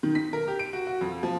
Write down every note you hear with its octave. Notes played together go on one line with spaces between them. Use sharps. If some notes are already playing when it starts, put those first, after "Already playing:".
D#3
B6
A#4
G4
D7
F#4
F#4
F2
F3